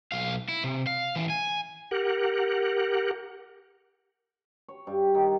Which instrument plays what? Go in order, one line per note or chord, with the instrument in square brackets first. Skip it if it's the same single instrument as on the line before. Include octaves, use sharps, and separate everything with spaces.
[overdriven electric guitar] B1 F5
E4
C3
F5
A2 E3
G#5
[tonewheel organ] G4 A#4 F#5
[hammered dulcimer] C#5
G2
D#3